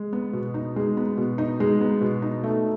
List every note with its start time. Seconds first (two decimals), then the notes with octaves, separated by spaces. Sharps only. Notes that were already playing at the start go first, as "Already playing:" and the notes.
Already playing: G#3
0.13 B3
0.33 B2
0.54 D#4
0.76 G#3
0.97 B3
1.17 B2
1.38 D#4
1.60 G#3
1.81 B3
2.01 B2
2.22 D#4
2.43 A3